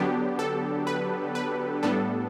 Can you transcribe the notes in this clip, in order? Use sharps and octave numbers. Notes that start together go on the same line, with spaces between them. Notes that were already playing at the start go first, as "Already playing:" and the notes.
Already playing: D3 F#3 B3 D4 G4
A4
B4
B4
A2 G3 B3 D4 A4